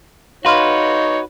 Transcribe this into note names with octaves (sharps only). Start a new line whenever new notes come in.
D#4 F#4 B4 C#5 F5 C6 F6